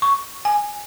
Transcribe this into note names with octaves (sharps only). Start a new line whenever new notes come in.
C#6
G#5